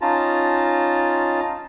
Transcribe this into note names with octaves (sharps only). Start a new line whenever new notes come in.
C#4 D#4 F4 A5 A#5